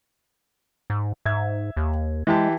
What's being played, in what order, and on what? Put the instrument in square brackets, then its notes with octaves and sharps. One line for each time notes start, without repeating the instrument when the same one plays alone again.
[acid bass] G#2
[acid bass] G#2 [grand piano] E5 G#6
[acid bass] D#2
[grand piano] E3 G4 A5 [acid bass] G#3